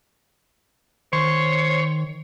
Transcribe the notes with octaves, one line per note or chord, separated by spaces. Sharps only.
D#3 C5 C#5